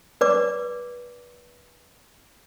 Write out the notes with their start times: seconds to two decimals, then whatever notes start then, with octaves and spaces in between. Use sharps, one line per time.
0.21 B4 D5 D6